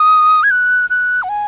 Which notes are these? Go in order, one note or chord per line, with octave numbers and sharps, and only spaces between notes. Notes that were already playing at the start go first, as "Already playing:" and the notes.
Already playing: D#6
G#6
F#6
F#6
F#5
G#5